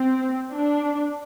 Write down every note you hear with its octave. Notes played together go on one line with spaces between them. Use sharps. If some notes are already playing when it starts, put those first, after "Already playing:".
Already playing: C4
D4